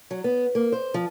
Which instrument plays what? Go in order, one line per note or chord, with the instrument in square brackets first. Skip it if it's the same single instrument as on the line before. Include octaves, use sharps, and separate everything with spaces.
[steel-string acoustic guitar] F#3
B3
A#3
C5
F3